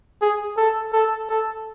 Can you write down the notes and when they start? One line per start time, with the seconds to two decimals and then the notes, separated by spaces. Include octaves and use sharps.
0.22 G#4
0.57 A4
0.93 A4
1.29 A4